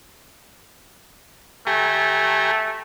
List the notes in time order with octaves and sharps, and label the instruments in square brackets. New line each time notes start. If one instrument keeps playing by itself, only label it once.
[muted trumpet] A3 [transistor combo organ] G4 G#5 A#5